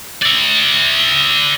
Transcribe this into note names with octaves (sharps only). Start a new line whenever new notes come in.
D5 E5